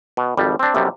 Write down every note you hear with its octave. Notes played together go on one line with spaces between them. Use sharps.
B2
G#1 F2 G3
C4 D4
B1 F#2 C3 G3